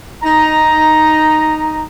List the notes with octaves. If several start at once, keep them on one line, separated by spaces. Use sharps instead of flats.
D#4 A#5